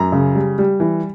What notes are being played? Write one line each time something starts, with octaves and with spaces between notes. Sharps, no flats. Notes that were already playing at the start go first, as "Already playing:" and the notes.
Already playing: F#2 A#5
C#3
G3
G3
E3